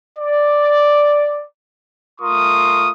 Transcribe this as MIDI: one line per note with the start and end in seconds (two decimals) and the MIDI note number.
0.19 1.45 74
2.21 2.90 57
2.21 2.90 65
2.21 2.90 70
2.21 2.90 84
2.21 2.90 85
2.21 2.90 87